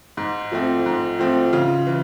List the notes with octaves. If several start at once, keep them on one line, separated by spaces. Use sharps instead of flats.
G#2
F3 A3 C4
G#2
F3 A3 C4
C#3 F4
E3